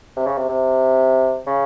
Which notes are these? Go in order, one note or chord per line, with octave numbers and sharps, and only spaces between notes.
C3
C#3
C3
C3
C#3